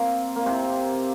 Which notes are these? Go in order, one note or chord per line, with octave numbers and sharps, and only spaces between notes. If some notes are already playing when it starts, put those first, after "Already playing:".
Already playing: A#3 C4
A#3
C3 C4